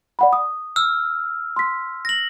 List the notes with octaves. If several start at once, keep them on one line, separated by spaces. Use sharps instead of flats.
D5 F#5 B5
D#6
E6 F6
C6 B6
A#6 F#7